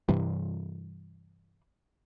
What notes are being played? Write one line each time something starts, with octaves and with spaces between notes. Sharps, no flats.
G2 C3 E3 G3